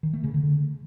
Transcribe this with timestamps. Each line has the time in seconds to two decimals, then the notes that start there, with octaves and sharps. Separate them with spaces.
0.03 D#3
0.13 A3
0.24 C#3
0.34 D3